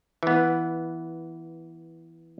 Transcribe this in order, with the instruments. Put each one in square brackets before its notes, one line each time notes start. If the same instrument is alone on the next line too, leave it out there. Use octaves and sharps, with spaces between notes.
[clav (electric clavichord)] E3 B3